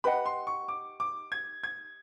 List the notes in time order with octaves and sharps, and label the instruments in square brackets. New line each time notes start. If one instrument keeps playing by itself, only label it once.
[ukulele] G4 B4 D#5 F#5 [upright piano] B5
[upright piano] C6
C#6
D6
D6
G#6
G#6